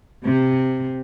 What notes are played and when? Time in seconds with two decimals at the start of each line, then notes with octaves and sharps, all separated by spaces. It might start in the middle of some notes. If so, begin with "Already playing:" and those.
0.24 C3